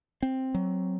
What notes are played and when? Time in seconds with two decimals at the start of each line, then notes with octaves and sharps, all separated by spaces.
0.22 C4
0.54 F#3